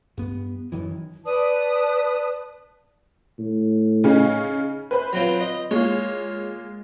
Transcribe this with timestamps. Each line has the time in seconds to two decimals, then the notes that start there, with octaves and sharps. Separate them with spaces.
0.18 G2 B3
0.72 F#2 D#3 E3
1.25 B4 D5 A5 D#6
3.39 A2
4.04 C#3 C#4 D#4
4.91 B4 C5 B5
5.13 F#3 C4 F4
5.41 D#5
5.71 G#3 A#3 F4 C#5